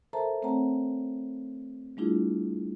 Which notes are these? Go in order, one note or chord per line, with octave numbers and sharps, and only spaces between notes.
A4 A#4 C5 E5 A5 A#5
A3 C4 C#5 F#5 A5 A#5
G3 A3 D4 E4 F4 G#4